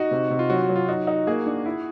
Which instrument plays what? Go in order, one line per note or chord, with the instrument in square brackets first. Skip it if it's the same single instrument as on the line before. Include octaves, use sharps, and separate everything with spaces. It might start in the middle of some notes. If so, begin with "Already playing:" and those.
Already playing: [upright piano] D#4 [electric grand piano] F#4
[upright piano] C3
C3
[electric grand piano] F4
[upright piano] F#3 [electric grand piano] F#4
[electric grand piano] F#4
[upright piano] F#3
[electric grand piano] F4
[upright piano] D#4 [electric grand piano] F#4
[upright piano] D#4
[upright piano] A#3 [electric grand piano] G#4
[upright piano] D4
E4